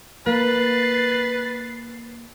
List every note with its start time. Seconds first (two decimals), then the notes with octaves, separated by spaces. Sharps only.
0.26 A#3 B4 A6 C7